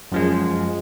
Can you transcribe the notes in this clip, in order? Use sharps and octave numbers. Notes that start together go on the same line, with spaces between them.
F#2 F3 G#3